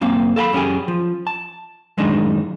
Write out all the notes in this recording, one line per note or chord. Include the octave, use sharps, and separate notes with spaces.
F#2 A#3 C4 F5
A4 F5 G5 B5
F#2 C#4 G4 G#4
F3
A5
F#2 A2 D#3 G#3 D4 D#4